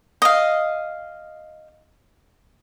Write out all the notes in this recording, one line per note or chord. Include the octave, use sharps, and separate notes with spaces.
D#5 F5